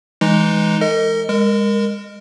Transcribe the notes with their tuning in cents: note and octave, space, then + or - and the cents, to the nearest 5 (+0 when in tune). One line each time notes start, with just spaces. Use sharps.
E3 +0 G#3 +0 D#4 +0
A#4 -45 D#5 +15
G#3 -25 A#4 +0